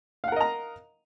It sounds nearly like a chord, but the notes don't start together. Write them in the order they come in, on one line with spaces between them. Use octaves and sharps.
F5 F#5 A#4 D#5 A#5